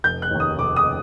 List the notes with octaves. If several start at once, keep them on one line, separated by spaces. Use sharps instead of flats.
F1 G6
F#6
D#2 D#3
D#6
F1 D6
D#6